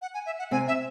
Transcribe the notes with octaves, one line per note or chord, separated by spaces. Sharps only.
F#5
G#5
E5
F#5
C3 C4 G#5
E5